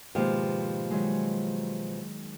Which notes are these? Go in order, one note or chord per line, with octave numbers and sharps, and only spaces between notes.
G#2 B2 D#3 F3 A#3 G4
D#3 F#3 G#3